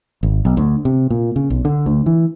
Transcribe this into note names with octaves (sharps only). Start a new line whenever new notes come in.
G#1
B1
D2
C3
A#2
C#3
B1
D3
D2
E3